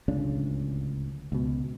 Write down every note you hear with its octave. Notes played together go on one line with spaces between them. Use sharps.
D1 C#2 C#3 D4
C#2 B2